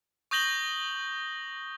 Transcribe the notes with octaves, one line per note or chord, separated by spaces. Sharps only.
C#6 D#6 G6 A#6 F#7 G7